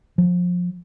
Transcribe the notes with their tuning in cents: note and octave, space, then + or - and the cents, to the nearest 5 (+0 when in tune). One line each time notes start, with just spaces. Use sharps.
F3 +25